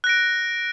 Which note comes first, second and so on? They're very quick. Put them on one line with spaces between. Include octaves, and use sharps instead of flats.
F#6 A#6 D7